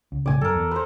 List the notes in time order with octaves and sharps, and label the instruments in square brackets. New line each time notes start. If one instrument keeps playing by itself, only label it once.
[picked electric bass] C#2
[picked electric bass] C2 A2 C#3 [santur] D5 G#5
[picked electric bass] F#2 [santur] A4 A#4
[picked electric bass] E2
[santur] B4 C5